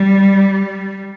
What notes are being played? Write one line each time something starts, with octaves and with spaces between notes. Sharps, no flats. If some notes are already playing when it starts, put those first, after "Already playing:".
Already playing: G3